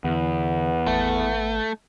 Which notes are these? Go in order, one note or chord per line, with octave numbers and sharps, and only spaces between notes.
E2 D3 B3
G#1 A3